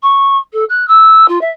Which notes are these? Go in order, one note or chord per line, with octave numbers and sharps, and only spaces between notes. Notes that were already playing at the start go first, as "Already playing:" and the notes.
C#6
A4
F#6
E6
F4
E5